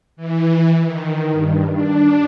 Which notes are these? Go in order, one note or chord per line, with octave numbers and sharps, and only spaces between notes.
E3
D#3
G2
D4